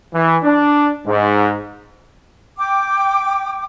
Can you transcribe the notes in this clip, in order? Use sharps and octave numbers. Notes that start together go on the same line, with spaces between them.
E3
D4
G#2
G5 D6